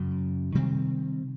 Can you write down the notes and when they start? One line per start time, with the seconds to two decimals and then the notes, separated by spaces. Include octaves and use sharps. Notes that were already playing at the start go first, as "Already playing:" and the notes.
Already playing: F#2 C#3 F#3
0.55 C3 D#3 G3 C4